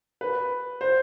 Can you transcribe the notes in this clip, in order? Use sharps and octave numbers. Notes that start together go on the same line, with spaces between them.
B4
C5